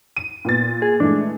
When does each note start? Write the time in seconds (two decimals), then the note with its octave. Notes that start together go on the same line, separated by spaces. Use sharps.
0.16 D#7
0.45 A#2 B3 A6
0.82 G#4
1.00 E3 G#3 A3 D4